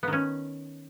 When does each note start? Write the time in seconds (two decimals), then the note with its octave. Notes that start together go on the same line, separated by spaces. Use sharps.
0.03 B3
0.08 D#3
0.13 C#4